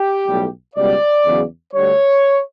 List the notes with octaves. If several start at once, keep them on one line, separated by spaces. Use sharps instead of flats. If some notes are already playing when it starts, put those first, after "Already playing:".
Already playing: G4
B1 A2 G3
C#2 B2 G3 D5
E2 C#3 F#3
D2 D3 G3 C#5